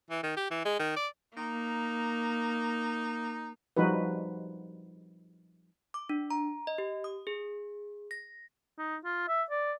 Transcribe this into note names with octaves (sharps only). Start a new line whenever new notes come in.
E3
D#3
G4
E3
G#3
D#3
D5
A#3 D#4
F3 G3 D#4 F#4 B4
D6
D4
A#5
D#5
G4
D#6
G#4
A#6
D#4
F4
E5
D5